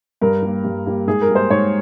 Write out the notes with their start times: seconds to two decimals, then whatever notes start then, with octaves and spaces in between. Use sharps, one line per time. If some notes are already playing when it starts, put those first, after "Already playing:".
0.21 G2 A#4
0.42 G3 A#3
0.64 G2
0.86 G3 A#3
1.07 G#2 G#4
1.22 A#4
1.28 G3 A#3
1.35 C5
1.50 G#2 C#5